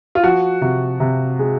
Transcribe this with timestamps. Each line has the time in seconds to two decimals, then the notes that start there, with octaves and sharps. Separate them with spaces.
0.15 F4
0.23 F3 F#4
0.61 C3 F#4
1.00 C3
1.39 G#3